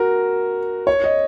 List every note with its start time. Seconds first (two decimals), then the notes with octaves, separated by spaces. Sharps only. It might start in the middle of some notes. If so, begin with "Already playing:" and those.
Already playing: F#4 A#4
0.87 C#5
1.04 D#5